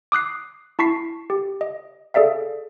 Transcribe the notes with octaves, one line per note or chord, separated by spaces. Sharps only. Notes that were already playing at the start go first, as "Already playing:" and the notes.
D6 D#6 F#6 C7
E4 A5 C#6 B6 C7
G4
D#5
G#4 A4 D5 E5 F5